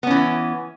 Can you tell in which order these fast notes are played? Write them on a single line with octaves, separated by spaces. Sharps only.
B3 C#4 E3